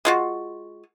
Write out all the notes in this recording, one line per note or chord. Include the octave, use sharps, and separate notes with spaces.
G#3 F4 F#4